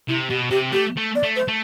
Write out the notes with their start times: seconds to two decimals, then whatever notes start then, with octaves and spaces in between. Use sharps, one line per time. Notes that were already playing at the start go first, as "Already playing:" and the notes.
0.08 C3 E4
0.30 B2 G4
0.50 C3 G4
0.72 A3 G4
0.97 A3
1.15 D5
1.23 A3
1.36 C5
1.48 A3